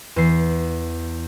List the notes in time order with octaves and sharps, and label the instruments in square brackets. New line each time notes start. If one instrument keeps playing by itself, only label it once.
[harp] E2 E3 C7